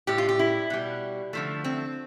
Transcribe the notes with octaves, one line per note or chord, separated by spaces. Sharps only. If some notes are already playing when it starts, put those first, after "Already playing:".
A2 G3 G4
F4
G4
E4
B2 G3
D3 F3 A3
C4